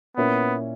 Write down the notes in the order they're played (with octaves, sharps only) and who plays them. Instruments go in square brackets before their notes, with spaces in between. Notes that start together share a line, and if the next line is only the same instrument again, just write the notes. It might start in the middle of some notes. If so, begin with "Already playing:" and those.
[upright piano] A#2 A#3 C#4 E4 [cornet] B3